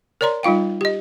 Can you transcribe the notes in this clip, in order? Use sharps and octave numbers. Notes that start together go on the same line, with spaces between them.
A#4 C#5 D5 A#5 C6
G3 D#4 F4 F5 G5
G4 D#5